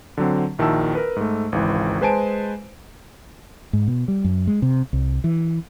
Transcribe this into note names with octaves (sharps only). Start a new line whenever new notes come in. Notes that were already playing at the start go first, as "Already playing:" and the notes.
D3 F#3 C4
A#1 D#3 E4 F#4 A5 E6
A#4 B4
G#2 A3
G#1 C#2 E3
G#3 B4 C5 G#5 A5 D7
G#2
B2
G3
F#2
G#3
C3
C2
E3